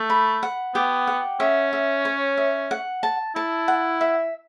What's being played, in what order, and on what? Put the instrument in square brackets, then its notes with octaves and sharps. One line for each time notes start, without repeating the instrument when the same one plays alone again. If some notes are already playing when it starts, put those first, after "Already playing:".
Already playing: [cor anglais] A3
[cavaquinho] B5
F#5
[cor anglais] B3 [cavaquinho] G4
[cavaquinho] F#5
[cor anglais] C#4 [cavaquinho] E5
[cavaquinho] E5
C#5
E5
F#5
A5
[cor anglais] E4 [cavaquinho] A5
[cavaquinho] F#5
E5